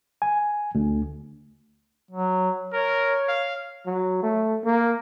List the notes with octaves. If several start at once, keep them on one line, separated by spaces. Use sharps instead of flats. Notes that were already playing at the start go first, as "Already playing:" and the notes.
G#5
D2
F#3
A#4 C#5
F5
F#3
A3
A#3